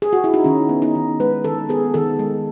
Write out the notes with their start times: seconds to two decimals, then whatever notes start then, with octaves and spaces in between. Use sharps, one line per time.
0.02 G#4
0.13 F#4
0.24 E4
0.34 D#4
0.44 D#3 C#4
0.69 B3
0.82 D#4
0.95 D#3
1.20 G#3 B4
1.44 D#3 A4
1.69 B3 G#4
1.94 D#3 A4
2.19 G#3